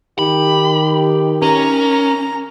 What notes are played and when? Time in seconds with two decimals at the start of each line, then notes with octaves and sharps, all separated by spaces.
0.19 D#3 G4 B5
1.42 C#4 A#4 A#5